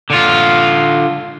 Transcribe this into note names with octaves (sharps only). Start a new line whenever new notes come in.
D3 F4